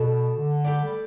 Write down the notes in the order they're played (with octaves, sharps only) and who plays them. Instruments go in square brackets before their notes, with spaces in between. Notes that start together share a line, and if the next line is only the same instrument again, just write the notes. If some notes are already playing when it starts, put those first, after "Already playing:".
Already playing: [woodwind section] B2 [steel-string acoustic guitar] A3 D4 A4
[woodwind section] D3
[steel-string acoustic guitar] A3 G4 B4 D5
[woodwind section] G3